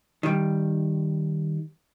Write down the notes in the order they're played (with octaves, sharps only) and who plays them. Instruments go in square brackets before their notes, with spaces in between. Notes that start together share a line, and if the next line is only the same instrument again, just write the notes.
[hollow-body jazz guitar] D#3 G3